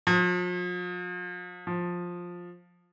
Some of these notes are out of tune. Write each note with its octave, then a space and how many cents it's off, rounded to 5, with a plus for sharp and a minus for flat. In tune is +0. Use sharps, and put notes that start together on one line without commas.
F3 +40
F3 +10